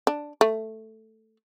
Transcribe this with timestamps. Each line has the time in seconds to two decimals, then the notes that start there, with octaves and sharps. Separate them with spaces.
0.07 D4
0.41 A3